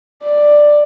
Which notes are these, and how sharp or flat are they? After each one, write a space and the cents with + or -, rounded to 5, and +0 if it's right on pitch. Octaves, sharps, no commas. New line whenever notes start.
D5 +10